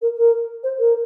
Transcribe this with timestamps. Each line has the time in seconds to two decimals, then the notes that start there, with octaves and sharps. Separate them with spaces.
0.01 A#4
0.17 A#4
0.63 C5
0.79 A#4